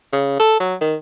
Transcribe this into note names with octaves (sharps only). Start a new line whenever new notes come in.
C#3
A4
F#3
D#3